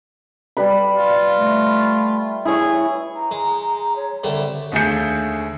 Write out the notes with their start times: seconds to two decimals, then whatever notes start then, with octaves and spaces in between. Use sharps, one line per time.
0.57 G3 B4 B5
0.98 F4
1.36 A3
2.45 E4 G#4 C#5
3.16 A#5
3.31 G#3
3.96 C#5
4.24 C2 D3 G3 E5
4.72 D#2 D3 A3 G#4 G6 C#7